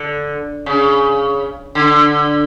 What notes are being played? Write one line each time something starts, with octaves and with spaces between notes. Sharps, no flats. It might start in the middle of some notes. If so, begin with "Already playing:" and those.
Already playing: D3
C#3
D3